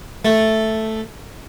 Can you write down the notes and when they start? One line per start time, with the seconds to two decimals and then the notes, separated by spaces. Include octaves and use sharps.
0.25 A3